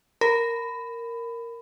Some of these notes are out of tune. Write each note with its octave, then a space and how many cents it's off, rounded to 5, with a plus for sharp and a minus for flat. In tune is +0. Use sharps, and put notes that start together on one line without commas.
A#4 -5 B5 +20